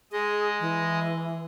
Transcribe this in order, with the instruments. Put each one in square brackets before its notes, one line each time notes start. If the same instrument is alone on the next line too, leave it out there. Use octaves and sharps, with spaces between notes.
[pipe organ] G#3 D#5 [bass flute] G#4
[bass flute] E3